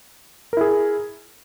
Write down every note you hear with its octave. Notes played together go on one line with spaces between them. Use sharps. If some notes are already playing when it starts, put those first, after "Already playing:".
E4 G#4 A#4